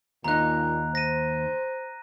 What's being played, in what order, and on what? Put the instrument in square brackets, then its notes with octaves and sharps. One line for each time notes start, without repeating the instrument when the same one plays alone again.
[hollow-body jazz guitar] D#2 D#4 [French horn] A#2 [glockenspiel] A#5 F#6
[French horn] C5 [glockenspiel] A#6 D#7